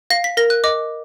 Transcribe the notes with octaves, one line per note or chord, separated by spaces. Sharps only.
F5 A#6
B6
A#4 A#6
F#6
D#5 D6